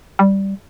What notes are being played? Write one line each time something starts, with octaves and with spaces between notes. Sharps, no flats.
G3